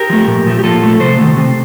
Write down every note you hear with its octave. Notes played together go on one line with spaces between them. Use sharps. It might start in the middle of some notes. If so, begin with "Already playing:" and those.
Already playing: G4 A#4
F3 A3
A#2
F3 A3
G4
A#2 F4 A4
F3 A3
C3 A4 C5
D#3 A3
C3